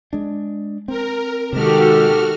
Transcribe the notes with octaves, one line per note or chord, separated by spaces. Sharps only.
G#3 D4
C4 A#4
C3 D#3 G#3 F#4 G4 A4 F6